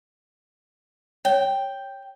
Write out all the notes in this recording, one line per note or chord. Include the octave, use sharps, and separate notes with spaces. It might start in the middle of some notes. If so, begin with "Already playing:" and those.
C#5 G5